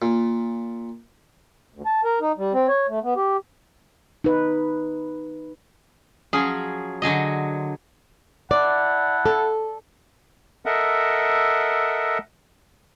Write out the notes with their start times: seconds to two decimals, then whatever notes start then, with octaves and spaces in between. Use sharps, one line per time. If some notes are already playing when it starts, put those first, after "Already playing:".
0.02 A#2
1.74 D2
1.86 A5
2.05 A#4
2.21 D#4
2.37 G3
2.53 C4
2.68 C#5
2.88 A3
3.03 B3
3.16 G4
4.24 D#4 B4
6.33 F3 F#3 C#4 G#4
7.02 D3 F#3 G#4 D#5
8.51 E4 D5 F#5 A5
9.26 A4
10.66 A4 A#4 D#5 E5 F#5